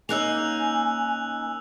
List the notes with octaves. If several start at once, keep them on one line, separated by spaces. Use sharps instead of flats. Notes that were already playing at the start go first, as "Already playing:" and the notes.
A#3 C#4 D#4 G#5 E6 F#6 F7